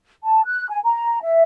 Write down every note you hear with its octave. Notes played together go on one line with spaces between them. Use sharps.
A5
F#6
G#5
A#5
E5